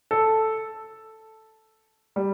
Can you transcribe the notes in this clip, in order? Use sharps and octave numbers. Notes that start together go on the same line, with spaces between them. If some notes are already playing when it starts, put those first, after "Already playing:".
A4
G3